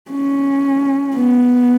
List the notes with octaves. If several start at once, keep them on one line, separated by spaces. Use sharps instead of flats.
C#4
B3